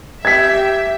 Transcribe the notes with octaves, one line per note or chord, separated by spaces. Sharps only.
G4 E5 G#6 B6